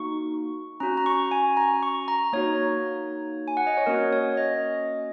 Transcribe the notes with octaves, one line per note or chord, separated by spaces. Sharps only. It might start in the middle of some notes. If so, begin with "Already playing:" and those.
Already playing: A#3 D#4 F#4 C#6
C#4 F#4 A#5
A#5
C#6
G#5
A#5
C#6
A#5
A#3 D#4 F#4 C#5
G#5
F#5
D#5
C#5
A#3 C#4 F#4 A#4
C#5
D#5